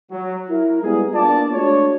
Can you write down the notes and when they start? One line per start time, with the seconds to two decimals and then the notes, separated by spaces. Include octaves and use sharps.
0.11 F#3
0.49 E4 A#4
0.83 G3 G#3 B3 F4 G#4
1.14 A#3 B3 D4 F4 D5 A5
1.52 G#3 A3 D4 F#4 C#5